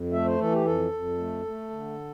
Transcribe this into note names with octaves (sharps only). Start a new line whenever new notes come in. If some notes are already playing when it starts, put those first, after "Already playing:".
Already playing: F2
A3 E5
C5
E3 A4
G4
F2 A4
F2
A3
A3
D3